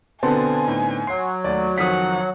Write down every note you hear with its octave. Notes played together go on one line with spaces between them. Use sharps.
B2 D3 B3 C4 G#5 A5 C6
A2 D#4
F#3 F#5 C6 C7
D#2 A3 D5
F2 D#3 F3 F#5 D#6 B6